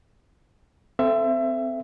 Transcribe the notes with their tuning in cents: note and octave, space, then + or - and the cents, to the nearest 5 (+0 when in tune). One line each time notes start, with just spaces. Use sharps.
C4 -20 A4 +0 E5 +25